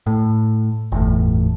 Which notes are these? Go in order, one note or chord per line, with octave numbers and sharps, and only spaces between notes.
A2
G1 E2 A2